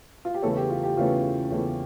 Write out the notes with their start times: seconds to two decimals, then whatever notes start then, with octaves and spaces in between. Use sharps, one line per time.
0.25 F4
0.35 G4
0.42 E2 C#3 E3 A3 C#4 A4
0.57 G4
0.70 F4
0.83 G4
0.97 E2 C#3 E3 A3 C#4 F4
1.51 E2 C#3 E3 A3 C#4